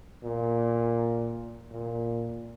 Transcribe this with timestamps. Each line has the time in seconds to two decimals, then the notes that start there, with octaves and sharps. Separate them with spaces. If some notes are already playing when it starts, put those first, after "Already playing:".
0.23 A#2
1.71 A#2